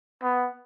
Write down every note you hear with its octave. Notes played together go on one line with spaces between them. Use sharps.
B3